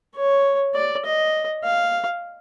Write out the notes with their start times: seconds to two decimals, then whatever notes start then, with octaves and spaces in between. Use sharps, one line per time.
0.16 C#5
0.75 D5
1.05 D#5
1.64 F5